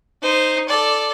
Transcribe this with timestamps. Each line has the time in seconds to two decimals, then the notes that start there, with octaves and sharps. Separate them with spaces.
0.22 D#4 C5
0.68 A4 D5